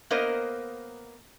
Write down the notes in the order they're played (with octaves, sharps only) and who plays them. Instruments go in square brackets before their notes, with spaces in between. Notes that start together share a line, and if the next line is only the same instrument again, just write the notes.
[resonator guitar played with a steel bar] A#3 B3 A#4 C5 D#5